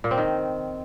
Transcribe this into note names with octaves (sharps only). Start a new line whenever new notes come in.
A#2
C4
D#3